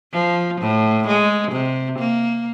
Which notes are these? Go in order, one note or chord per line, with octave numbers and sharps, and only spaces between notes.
F3
A2
G#3
C3
A#3